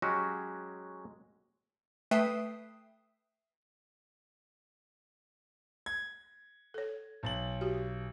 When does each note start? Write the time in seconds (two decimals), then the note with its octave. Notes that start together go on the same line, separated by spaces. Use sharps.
0.02 F#3 G#3 C#4 F#4 G4
2.11 A3 B4 E5 G5 D#6 C7
5.86 G#6
6.74 A4 C#5
7.23 B1 A6 F#7
7.61 F#4 G4